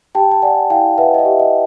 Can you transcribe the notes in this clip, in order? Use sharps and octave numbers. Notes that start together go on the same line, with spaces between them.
G4 G5 A5
A5
D5 F#5 G#5
E4 F5 G5
B4 E5 F#5
D#5
E5
G4
D#5